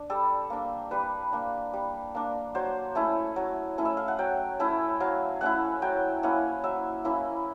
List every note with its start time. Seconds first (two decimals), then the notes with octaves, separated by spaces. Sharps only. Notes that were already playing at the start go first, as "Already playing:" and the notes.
Already playing: D4
0.10 G3 A4
0.50 A#3 D4
0.91 G3 B4
1.32 A#3 D4
1.73 G3
2.15 A#3 D4
2.55 F#3 C5
2.95 A3 C#4 E4
3.36 F#3
3.78 A3 C#4 E4
3.85 E5
3.97 F5
4.08 F#5
4.19 F#3 G5
4.60 A3 C#4 E4
5.00 F#3 F5
5.41 A3 C#4 E4 F#5
5.82 F#3 G5
6.23 A#3 C#4 E4 F#5
6.64 F#3 E5
7.05 A#3 C#4 E4